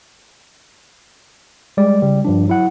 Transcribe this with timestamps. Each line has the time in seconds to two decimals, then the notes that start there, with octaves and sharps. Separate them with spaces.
1.77 G3 G#3 D5
2.02 C#3 G3
2.25 G2 F3 D4
2.48 F#3 E4 F#5